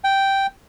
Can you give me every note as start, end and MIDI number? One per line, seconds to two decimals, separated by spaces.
0.04 0.47 79